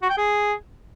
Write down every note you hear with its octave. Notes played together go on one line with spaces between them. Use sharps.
F#4
G5
G#4